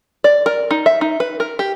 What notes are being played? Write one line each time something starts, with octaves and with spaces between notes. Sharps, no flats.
D5
A#4
D#4
E5
D#4
B4
A#4
G4